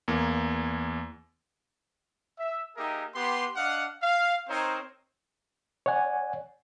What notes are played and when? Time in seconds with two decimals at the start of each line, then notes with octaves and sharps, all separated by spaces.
0.08 E2 A#3
2.38 E5
2.77 A#3 D#4 G4 G#4 A#4 E5
3.14 B3 G4 C6
3.56 D4 D#5 F5 F#5
4.02 F5
4.48 C4 D#4 A#4 C5 C#5
5.86 C#5 D5 F#5 G#5